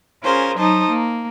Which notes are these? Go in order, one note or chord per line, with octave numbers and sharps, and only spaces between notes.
C#4 F4 G#4 A#4 C5
F#3 D#4 C5 A5 D#6
A#3